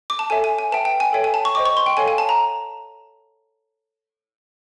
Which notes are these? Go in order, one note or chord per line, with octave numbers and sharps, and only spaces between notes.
D6
A5
A4 C#5 E5 G#5
G#5
G#5
B4 E5 G5 A5
G5
G#5
A4 C#5 E5 G5
G#5
A5
C#6
C5 D#5 G5 D6
C#6
C6
G5
A4 C#5 F5 G#5
G#5
A5
A#5